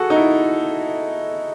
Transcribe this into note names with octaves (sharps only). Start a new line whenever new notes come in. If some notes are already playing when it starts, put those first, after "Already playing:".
Already playing: F#4 G#4 A4
D#4
E4